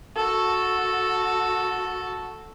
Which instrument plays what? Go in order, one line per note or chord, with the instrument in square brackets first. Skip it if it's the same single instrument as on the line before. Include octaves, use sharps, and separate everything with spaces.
[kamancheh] F#4 A4